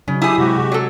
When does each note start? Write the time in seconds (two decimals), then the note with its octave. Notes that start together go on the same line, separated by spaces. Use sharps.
0.08 C#3 F#3 D#4
0.22 E4 G4 G#4 G#5 D#6
0.38 C3 G#3 F#4 G4 C5
0.56 C3 G#4
0.72 F#3 A4